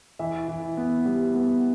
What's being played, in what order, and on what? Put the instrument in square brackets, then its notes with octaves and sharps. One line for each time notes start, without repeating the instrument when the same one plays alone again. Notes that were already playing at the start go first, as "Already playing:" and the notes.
[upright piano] E3 E5
E3
B3
G3
B3